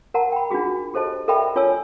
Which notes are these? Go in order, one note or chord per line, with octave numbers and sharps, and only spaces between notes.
A#4 F#5 A5 A#5
G5 B5
D4 D#4 F4 F#4 G#4
G4 A4 C5 D#5 A5
A4 A#4 D5 E5 G5 B5
D4 F4 C#5 G#5 A5 E6